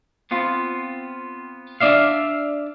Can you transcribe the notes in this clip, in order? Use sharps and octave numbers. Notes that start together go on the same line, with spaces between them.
B3 C4 F4
D4 D5 E5 F5